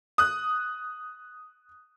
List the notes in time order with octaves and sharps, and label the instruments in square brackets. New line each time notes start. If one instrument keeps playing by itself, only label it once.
[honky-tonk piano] D#6 F#6